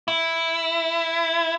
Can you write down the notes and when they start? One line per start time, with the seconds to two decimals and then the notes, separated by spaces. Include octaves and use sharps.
0.08 E4